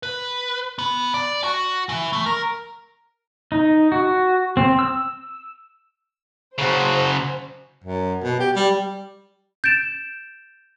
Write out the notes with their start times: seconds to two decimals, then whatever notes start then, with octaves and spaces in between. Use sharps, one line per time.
0.03 B4
0.79 B3
1.14 D5
1.44 F#4
1.89 E3
2.13 A3
2.26 A#4
3.52 D#4
3.92 F#4
4.57 C4
4.79 E6
6.58 C#3 F#4 C5
7.84 F#2
8.24 B2
8.40 G4
8.56 G3
9.64 G6 A6 D7 E7